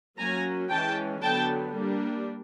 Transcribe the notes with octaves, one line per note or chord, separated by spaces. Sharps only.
F#3 A#3 C#4 G#5 A#5
E3 G#3 C#4 G5 A5
D3 F#3 B3 D4 G5 A5
G3 A#3 D4